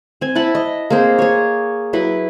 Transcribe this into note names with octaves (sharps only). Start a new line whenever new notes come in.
C4 G#5
E4 F#5 A5 B5
D#5
A#3 C4 G#4 C5
G#4 C#5
F#3 E4 B4